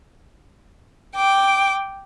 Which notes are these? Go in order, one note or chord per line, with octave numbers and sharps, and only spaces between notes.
G5 D6